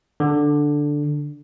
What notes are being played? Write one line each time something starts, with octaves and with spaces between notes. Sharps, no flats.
D3